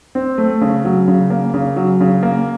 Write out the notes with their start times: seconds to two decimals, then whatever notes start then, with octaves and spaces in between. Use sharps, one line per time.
0.15 C4
0.38 A3
0.61 C#3
0.85 F#3
1.08 C#3
1.30 A#3
1.54 C#3
1.76 F#3
2.00 C#3
2.23 A#3